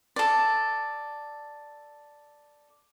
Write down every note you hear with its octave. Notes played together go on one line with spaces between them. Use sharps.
A4 D5